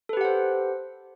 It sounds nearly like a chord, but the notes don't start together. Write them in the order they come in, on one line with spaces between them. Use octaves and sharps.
A4 B4 G4 F#5 C5